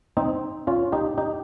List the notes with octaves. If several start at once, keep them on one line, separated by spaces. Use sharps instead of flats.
C4 D#4
C#4 F4
D#4 G4
D#4 G4